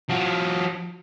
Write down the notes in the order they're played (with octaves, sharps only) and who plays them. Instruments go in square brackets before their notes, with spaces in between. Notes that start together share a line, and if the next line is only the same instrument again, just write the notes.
[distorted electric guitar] F3 F#4